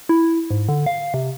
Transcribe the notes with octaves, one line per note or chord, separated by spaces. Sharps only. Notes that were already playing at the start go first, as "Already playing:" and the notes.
E4
G#2
D3
F5
C3